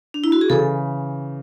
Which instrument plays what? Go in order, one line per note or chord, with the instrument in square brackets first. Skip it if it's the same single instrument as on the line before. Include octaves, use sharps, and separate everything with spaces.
[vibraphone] D4
E4
F#4
G#4
[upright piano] C#3 E3 [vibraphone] A4